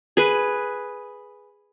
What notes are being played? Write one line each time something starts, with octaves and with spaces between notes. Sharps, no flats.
G#4 B4